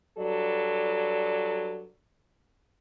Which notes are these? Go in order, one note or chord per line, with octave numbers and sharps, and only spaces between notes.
G2 F#3 A4 D5